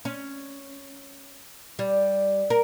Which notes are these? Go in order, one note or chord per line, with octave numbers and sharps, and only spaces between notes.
C#4
G3
A#4